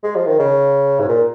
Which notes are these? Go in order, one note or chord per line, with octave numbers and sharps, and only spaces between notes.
G#3
F3
D#3
C#3
G#2
A#2